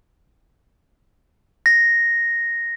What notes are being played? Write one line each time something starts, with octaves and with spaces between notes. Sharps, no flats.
A#6